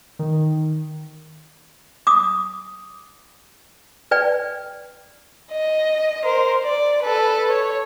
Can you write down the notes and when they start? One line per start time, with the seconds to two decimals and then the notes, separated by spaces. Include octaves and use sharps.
0.19 D#3
2.07 D6 D#6
4.11 B4 D5 G5
5.52 D#5
6.24 A#4 C5
6.64 D5
7.03 A4 B4
7.49 C#5